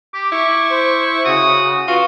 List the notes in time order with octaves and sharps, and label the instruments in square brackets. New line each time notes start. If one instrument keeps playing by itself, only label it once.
[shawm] G4 [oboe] D6
[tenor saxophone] E4 [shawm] C#6
[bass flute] C5
[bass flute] C#3 [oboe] F#4 [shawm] D#6
[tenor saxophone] F4 [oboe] F#4 [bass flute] B4